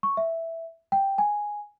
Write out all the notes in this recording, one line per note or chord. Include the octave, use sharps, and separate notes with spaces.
C#6
E5
G5
G#5